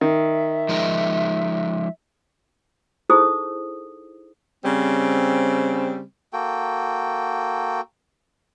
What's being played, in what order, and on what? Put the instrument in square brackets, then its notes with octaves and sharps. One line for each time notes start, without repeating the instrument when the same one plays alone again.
[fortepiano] D#3 [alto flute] E5
[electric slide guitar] F3 G#3 D#4
[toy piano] D#4 E4 G#4 A4 C5 D#6
[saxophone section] C#3 G3 C4
[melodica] A#3 F#4 A4 G5